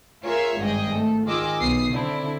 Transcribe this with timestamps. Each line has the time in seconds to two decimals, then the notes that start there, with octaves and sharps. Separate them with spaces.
0.24 F4 G#4 A#4 C#5 E5 F5
0.61 G#1 G2 G#4 D#5 G5
0.94 A3 A4
1.26 D#3 F4 G#4 D#5 D6 E6
1.60 B1 B3 D#6 C7
1.91 D3 C4 D4 E4